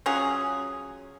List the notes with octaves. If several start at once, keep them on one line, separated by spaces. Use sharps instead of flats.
F#3 C#4 F4 G#4